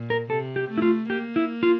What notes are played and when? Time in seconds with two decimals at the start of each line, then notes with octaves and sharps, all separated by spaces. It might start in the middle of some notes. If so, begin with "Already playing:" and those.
Already playing: A#2
0.10 A#4
0.29 C3 A4
0.56 G4
0.70 A3
0.78 E4
0.82 F4
1.09 A#3 G4
1.36 E4
1.63 F4